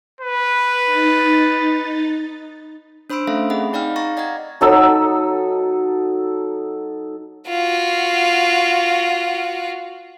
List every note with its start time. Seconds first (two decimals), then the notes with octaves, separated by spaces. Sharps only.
0.21 B4
0.86 D#4 A6
3.10 D4 C5 B5 C6 E6 D7
3.27 A3 C#4 A4 E5 F5
3.50 C4 G#4 D#5 F#5 B5
3.73 D#4 D5 F5 G5 F6
3.96 F5 A#5 C#6 A6 A#6
4.17 D5 D#5 F#5 A#5 G#6
4.61 F#3 D#4 A4 E6
7.47 F4 F#4